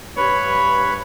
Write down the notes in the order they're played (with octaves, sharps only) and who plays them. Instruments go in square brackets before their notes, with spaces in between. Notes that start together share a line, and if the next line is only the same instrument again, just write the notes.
[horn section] G2 C#5 [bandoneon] B4 B5